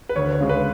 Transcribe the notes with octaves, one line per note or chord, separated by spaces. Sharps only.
B4
D2 C#5
C#5
C#3 G#3
B4